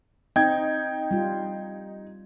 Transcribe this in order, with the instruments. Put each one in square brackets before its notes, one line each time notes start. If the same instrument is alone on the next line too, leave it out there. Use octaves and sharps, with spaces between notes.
[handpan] C4 [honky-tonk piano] D#4 [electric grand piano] G5 G#6
[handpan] G3 F4